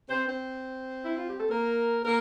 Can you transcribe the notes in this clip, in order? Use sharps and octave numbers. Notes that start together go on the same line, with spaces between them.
C4 C5
C4 C5
E4
F4
G4
A4
A#3 A#4
A#3 A#4